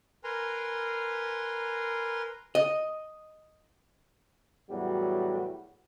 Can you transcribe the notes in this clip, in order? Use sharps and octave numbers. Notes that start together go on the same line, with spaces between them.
A#4 B4 G#5 A#5 C6
D#5
E2 A2 F#3 G3 F#4